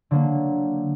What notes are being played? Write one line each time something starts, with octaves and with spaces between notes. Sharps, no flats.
D3 F#3 A#3